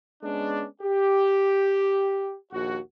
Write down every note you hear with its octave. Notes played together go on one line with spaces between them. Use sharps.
G#3 B3 C#4 D4
G4
A#1 D#2 F#4